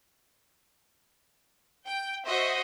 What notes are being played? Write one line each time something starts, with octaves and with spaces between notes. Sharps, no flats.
G5
F#4 C5 D#5 E5